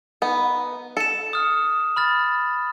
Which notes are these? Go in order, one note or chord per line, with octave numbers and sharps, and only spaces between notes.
B3 D#4
A4 C#7 E7
D#6 F6
B5 F6 A6